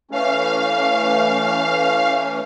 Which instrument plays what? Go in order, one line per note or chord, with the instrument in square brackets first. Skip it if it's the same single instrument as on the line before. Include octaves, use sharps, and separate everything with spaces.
[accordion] E3 A3 C#4 [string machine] F5